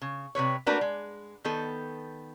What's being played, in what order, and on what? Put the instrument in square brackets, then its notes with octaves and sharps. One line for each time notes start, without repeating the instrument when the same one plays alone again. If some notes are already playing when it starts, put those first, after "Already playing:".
[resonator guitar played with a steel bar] C#3
C3 F#3 B4 C#5
A3 A#3 D4 F#4 A#4 B4
G#3
D#3 B3 A4